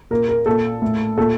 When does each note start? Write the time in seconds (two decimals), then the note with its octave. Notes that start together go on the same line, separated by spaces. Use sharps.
0.11 A#2 A#4
0.29 A#4
0.46 A#2 A4
0.82 A2
1.17 A#2 A4